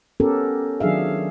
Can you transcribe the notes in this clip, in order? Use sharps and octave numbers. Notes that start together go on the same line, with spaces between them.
B3 C#4 G4 A4 A#4
D#3 F#3 D4 G#4 E5 F5